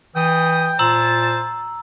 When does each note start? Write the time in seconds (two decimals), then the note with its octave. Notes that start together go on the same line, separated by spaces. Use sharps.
0.16 E3 G5 D#6
0.79 A#2 E4 F4 C5 A5 A#5 E6 F#7